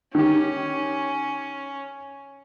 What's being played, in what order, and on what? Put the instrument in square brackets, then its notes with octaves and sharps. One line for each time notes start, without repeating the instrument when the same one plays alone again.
[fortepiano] D#3 G4 [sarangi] C#4